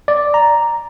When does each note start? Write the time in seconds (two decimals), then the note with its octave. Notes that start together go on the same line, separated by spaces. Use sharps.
0.08 D5
0.34 A#5